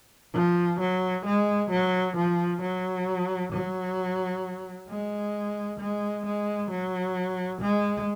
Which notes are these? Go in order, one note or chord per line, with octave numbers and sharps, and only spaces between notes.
F3
F#3
G#3
F#3
F3
F#3
F#3
G#3
G#3
G#3
F#3
G#3